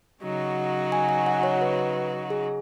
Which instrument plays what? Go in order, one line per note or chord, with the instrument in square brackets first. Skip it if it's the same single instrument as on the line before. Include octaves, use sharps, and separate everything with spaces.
[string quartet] C#3 F#3 D#4 F#4
[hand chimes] G#5
G#5
F#5
C#5
B4
G#4